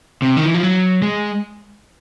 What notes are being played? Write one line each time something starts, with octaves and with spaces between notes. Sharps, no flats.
C3
D#3
E3
F3
F#3
G#3